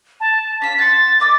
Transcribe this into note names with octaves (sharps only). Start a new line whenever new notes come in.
A5
C#4 F4 B6
F#5 C6 A6
D#5 D6 E6